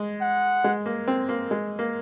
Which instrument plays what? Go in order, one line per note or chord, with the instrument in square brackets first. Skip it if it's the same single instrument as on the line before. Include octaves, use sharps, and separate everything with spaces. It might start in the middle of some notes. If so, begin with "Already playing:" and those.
Already playing: [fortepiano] G#3
[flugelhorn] F#5
[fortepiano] G#3
A#3
C4
A#3
G#3
A#3